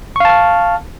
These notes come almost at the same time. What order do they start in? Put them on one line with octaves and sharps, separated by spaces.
C#6 F5 A5 F6